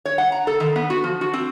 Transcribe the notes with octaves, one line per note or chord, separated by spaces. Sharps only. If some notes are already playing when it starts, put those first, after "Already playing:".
C#5
F#5
A#5
A4
D#3
B3
F#4
F3
F#4
C4